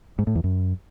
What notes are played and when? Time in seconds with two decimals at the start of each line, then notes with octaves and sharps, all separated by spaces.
0.19 G#2
0.27 A2
0.35 E2
0.44 F#2